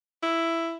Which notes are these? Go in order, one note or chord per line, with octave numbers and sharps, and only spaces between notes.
E4